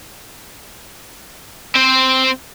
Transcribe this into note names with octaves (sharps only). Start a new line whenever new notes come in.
C4 C5